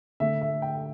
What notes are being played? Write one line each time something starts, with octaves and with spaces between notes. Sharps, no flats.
D3 A3 E5
E5
G5